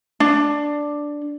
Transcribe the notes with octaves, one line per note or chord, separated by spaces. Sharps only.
D4